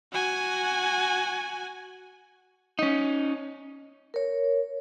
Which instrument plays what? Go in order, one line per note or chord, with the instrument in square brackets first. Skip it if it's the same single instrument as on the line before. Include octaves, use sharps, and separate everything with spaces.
[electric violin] F#4 G#5
[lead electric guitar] C#4 D#4
[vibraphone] A#4 C#5